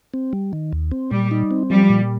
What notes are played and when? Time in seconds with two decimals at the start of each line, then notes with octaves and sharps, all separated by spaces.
0.14 C4
0.33 G3
0.53 D#3
0.73 D#2
0.91 C4
1.11 A#2 G3
1.31 D#4
1.51 C4
1.70 F3 G3
1.90 A#2